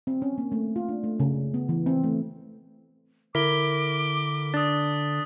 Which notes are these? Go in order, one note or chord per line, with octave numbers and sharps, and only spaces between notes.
C4
C#4
A#3
A3
F4
D4
A3
C#3
B3
E3
C4
A3
D3 E4 A#4 D6 B6 G7
D4 D#6 A6